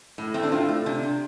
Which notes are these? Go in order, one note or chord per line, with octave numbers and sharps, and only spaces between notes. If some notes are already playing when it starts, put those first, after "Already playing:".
A2
A3 C4
D4
A2 C4 F4
A3
C3 D4
C3